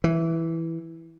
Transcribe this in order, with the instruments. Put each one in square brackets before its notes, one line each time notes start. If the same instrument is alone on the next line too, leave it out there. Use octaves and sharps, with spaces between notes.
[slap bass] E3